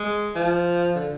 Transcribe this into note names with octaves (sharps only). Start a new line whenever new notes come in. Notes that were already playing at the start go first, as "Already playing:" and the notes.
Already playing: G#3
F3
D3